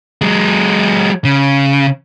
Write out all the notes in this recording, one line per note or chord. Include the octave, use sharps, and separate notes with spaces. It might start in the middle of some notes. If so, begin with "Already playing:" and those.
F#3 G#3
C#3